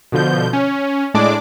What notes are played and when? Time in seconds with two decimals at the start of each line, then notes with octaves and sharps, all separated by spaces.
0.12 B2 D3 F3 G6
0.53 C#4
1.14 A2 G#3 D4 D5 D6